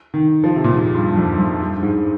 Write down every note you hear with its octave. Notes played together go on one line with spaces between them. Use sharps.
D#3
F3
C3
A#2
G#2
G2
F2
F2
G2
G#2